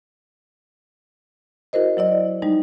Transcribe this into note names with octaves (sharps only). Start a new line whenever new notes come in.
E4 F#4 A#4 C5 D#5
F#3 E4 D5 D#5
G3 G#3 D#4